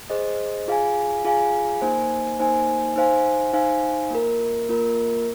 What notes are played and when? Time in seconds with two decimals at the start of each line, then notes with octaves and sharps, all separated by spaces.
0.10 G#4 C5 D#5
0.68 F4 G#4 F5 G#5
1.24 F4 G#4 F5 G#5
1.82 A#3 D#4 C5 G#5
2.40 A#3 D#4 C5 G#5
2.96 D#4 C5 F5 G#5
3.53 D#4 C5 F5 G#5
4.11 A#3 F4 A#4
4.69 A#3 F4 A#4